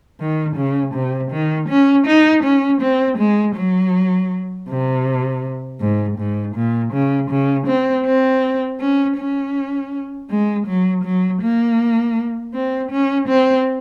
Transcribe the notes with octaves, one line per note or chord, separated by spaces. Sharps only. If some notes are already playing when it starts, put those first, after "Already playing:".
D#3
C#3
C3
D#3
C#4
D#4
C#4
C4
G#3
F#3
C3
G#2
G#2
A#2
C#3
C#3
C4
C4
C#4
C#4
G#3
F#3
F#3
A#3
C4
C#4
C4